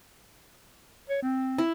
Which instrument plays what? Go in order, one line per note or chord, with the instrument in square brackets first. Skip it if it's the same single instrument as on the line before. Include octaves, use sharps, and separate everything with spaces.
[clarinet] C#5
C4
[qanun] E4